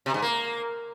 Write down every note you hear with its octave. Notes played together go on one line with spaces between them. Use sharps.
C3
G#2
A#3